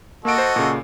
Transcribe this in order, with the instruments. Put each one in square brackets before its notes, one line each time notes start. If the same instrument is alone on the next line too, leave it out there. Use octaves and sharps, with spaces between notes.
[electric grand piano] A#3 D7 [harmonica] F#4 A4 D#5
[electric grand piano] C5
A#2 C#3